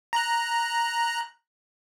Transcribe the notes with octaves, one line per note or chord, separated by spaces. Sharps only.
A#5 F#6